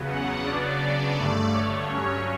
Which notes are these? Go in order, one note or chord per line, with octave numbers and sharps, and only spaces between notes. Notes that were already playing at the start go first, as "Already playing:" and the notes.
Already playing: E2 C#3 F#3 B3
F#5
C#3 F#3 B3 D4 D5
G2 D3 A3
C#5
G2 F#3 C#4 C#5